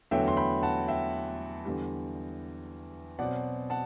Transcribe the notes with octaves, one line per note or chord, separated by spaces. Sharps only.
E2 D3 F#3 A3 E5 G5
C6
G5 B5
F#5 A5
E5 G5
E2 D3 G3
B2 F#3 C4 D5 F#5
F#5 A5